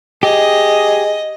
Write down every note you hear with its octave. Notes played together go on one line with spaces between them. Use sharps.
G4 G#4 D#5